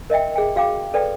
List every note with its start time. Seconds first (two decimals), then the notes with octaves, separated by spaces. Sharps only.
0.10 A#4 D#5 E5 G5
0.36 G#4 G5
0.56 F#4 F5 G5 D6
0.94 A4 B4 D5 G5